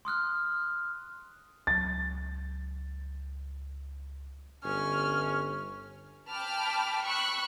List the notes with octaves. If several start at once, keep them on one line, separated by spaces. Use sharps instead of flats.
C6 D#6 F6 F#6
C#2 F#3 A6
G1 C#4 F6
G5 A5 B5 D6 F6
B5 C#6 E6 F#6